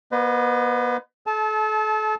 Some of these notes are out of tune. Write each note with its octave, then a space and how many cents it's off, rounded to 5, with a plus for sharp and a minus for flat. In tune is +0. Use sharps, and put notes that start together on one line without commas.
B3 -35 B4 +35 D#5 -20
A4 -35 A5 -25